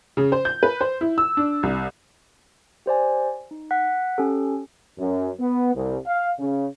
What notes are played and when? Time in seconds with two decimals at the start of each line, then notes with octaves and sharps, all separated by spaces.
0.17 C#3
0.32 C5
0.45 G6
0.63 B4
0.81 C5
1.01 E4
1.18 E6
1.37 D4
1.63 C2
2.86 G4 C5 D5 G#5
3.51 D#4
3.71 F#5 F#6 B6
4.18 C#4 G4 A4
4.98 F#2
5.39 B3
5.75 C2
6.06 F5
6.38 C#3